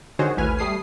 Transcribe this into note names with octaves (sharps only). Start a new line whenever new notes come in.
D3 D#3 F#4 G#4 C5 C#5
A1 D#2 A2 B4 G#5 F6
G3 A3 D#6 C7